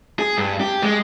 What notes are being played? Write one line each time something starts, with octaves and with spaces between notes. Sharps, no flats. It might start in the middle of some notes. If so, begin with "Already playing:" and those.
G#4
G2
G4
G#3